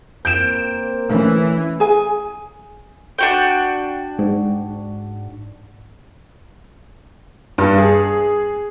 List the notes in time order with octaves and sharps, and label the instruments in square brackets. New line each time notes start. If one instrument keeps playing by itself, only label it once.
[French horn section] A#3 C4 [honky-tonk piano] G6 D7 E7
[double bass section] E3 [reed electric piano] A3 C#4
[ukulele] G#4 G#5
[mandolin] D4 F#4 G5
[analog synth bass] G#2
[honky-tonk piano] G2
G#4